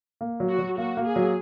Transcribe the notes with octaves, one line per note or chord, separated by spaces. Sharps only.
A#3
F#3
F#4
F#3
A#3 F#4
A#3
G#4
F#3